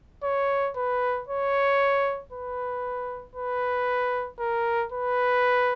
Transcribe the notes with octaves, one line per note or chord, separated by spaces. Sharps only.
C#5
B4
C#5
B4
B4
A#4
B4